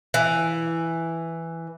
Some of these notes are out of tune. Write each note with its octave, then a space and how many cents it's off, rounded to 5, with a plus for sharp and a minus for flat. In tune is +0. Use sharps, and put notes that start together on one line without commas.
E3 +5